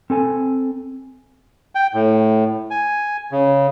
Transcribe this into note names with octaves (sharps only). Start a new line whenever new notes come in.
C4 A4 G#5
G5
A2
G#5
C#3